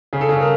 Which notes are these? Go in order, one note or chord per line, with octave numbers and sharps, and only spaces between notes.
C#3 G#4
A4
C#3 G#4
A#4